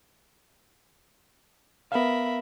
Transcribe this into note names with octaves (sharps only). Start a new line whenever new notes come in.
B3 A#4 E5 F5 B5